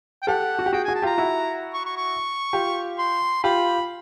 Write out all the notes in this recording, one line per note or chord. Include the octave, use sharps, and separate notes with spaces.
G5
G4 A4 F#5
F#4
G4
F#4 G#4 G5
F#4 G#4 G#5
A5
F4 G4 A#5
E4 F#4
C#6
C#6
C#6
F4 G4
C6
F4 G4 B5